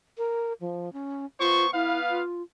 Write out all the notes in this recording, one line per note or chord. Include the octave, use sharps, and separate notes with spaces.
A#4
F3
C#4
B3 F4 C5 C#6
B3 E4 B4 F5
F4